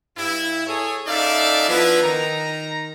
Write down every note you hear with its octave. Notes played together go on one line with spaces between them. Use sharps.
G2 E4
G#4 A4 C#5
F#2 D#4 A4 D5 E5 F5
F3 B3 D4 E4 B4
D#3 A#5